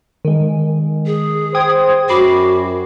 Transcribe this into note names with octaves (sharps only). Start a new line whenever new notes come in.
D#3 G#3
G#4
C5 G5 D#6 G#6
F#2 F#4 B5 D6 C7